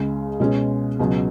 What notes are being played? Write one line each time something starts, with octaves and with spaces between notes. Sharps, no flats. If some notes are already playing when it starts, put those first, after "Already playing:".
Already playing: C#2 C#3 G#3
B2 G#3 C#4
C#2 B2 F#3